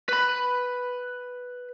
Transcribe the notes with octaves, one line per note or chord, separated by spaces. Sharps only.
B4 B5